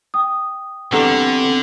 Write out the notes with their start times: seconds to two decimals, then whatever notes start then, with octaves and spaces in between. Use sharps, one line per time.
0.14 G5 D#6
0.93 E2 G2 D3 C4 A4 F#5 A#5